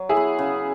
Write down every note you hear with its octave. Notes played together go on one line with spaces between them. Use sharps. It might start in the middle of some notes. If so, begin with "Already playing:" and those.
Already playing: F#3
E4 G#4
B3
C#3